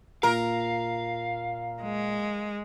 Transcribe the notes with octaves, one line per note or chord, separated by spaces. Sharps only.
A#2 A#4 F5
G#3